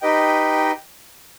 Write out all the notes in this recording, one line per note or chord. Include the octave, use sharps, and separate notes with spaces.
D#4 G4 B4 D#5 G5